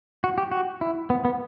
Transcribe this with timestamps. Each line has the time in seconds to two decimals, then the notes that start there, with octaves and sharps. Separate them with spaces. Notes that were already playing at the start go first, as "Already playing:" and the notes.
0.24 F#4
0.38 G4
0.51 F#4
0.81 E4
1.10 B3
1.25 B3